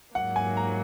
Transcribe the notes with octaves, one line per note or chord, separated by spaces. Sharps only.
G#2 F#3 A#3 F#5
G#5
A#5